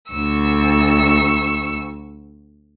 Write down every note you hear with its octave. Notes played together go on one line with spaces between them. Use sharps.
D2 C#6 E6